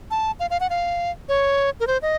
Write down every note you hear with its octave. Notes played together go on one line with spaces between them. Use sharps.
A5
F5
F5
F#5
F5
C#5
A#4
C5
D#5